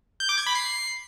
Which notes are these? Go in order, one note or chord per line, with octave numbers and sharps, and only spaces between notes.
G6
D6
G#6
B5
C7